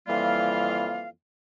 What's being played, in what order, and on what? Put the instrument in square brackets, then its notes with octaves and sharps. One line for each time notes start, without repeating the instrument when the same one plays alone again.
[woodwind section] F2 E3 G3 A#3 F4 F5